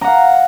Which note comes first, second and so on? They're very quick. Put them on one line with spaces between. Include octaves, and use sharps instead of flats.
A#5 F#5 F5